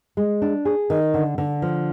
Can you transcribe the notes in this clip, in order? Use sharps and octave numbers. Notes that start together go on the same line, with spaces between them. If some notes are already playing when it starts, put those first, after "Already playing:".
G#3
D4
G#4
D#3
D3
D3
F3